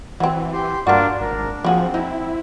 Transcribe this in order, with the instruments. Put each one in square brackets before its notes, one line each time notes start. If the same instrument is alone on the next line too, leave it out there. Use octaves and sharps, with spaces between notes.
[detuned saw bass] E3 [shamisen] F#3 C4
[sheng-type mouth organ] G4 C6
[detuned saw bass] G2 [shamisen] A#3 F#4 [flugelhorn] D4 [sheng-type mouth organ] F4 A#4
[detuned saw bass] G#1 [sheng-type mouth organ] D4 [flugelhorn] A#4
[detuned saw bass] F3 [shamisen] A#3 F#4 G#4 [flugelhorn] C4
[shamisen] D#4 [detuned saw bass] E4